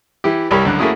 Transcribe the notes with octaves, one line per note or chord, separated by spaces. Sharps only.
E3 E4 G4
C2 G3 G4 A#4 C#5 B5
C#2 F#2 D3 F#6
A3 A#3 C#4 E4 F#4 G#4